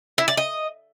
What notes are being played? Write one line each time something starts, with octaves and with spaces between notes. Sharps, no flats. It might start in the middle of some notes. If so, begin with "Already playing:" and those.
E4
D5
D#5